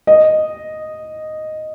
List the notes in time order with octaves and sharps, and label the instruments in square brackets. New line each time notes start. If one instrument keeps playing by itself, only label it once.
[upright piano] D#5